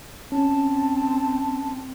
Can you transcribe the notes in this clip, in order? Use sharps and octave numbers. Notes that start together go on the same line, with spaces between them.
C4 C#4 A5